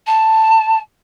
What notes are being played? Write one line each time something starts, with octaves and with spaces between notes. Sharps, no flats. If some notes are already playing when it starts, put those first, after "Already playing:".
A5